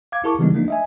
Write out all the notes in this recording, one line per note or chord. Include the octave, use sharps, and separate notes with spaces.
F5 D6 G#6
E4 G#4 A#4 A5 C#6 D6
C#3 E3 G3 G#3 B3 D#4
F3 A3 A#3 D4 D#4
D#5 E5 G#5